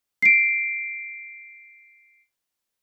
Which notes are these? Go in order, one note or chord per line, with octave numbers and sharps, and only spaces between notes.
C7 D7